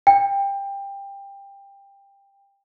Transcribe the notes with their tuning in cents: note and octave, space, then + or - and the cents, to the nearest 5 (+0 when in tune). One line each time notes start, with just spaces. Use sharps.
G5 +20